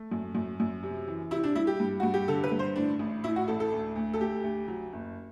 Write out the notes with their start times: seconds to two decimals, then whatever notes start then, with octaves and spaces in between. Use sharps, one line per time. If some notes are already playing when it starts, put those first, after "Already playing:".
Already playing: A3
0.12 F#2
0.35 F#2
0.60 F#2
0.83 C3
1.08 E3
1.31 C3 E4
1.44 D4
1.55 G3 E4
1.67 G4
1.80 G2
2.00 G2 F#4
2.14 G4
2.28 D3 A4
2.44 B4
2.51 G2
2.59 C5
2.76 A2 D4
2.99 A1
3.24 A2 E4
3.36 F#4
3.48 A1 A4
3.60 A4
3.72 D2
3.96 D2
4.14 A4
4.20 D2 G4
4.44 D2
4.68 F#3
4.93 F#1